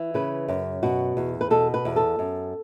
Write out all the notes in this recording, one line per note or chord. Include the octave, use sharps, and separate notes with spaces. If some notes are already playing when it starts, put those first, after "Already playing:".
Already playing: E3
C#3 B4
F#2
B2 F#4
E2
B4
B2 A4
B4
E2
A4
F#2